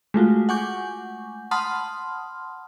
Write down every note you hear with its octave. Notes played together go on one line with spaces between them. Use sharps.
G#3 A3 F4 F#4
F#5 G#5 C#6 D6 G6
F#5 A5 B5 C6 D#6 F6